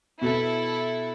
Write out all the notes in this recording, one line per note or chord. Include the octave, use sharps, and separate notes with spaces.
B2 E4 A4